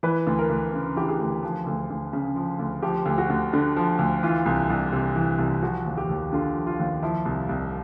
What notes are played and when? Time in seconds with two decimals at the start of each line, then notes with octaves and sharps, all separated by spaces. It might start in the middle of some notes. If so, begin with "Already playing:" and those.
0.03 E3 B4
0.27 D2
0.39 A#4
0.50 D2
0.73 C#3
0.96 E3 G4
1.09 G#4
1.20 D2
1.43 F3
1.67 D2
1.90 D2
2.13 C#3
2.36 F3
2.59 D2
2.82 F3 G4
3.06 D2
3.18 F#4
3.30 D2
3.53 D3
3.76 F3
3.99 D2
4.23 E3 F4
4.46 C2
4.70 C2
4.92 C3
5.16 E3
5.39 C2
5.62 F3 F#4
5.86 D#2
5.97 G4
6.09 D#2
6.33 D3 F4
6.55 F3
6.67 F4
6.80 D#2
7.03 F3 E4
7.25 C2
7.49 C2